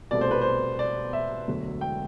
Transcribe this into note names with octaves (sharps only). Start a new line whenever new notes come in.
C2 B2 A3 D5
C5
B4
C5
D5
E5
E1 D2 D3 F#3
G5